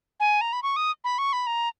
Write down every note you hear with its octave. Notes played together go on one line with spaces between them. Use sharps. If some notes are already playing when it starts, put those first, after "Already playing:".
G#5
A#5
B5
C#6
D#6
B5
C#6
B5
A#5